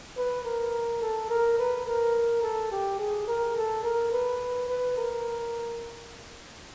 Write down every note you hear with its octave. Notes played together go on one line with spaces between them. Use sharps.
B4
A#4
A4
A#4
B4
A#4
A4
G4
G#4
A#4
A4
A#4
B4
B4
A#4